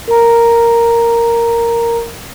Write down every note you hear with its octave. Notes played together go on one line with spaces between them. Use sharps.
A#4 A#5